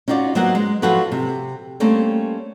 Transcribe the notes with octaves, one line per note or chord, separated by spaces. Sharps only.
C#4 D#4 F4 F#4 D5
F#3 A#3 B3 F#4 C5 F#5
G#3
F3 F#3 F4 F#4 A4 B4
C3
G3 A3 A#3 C4 C#4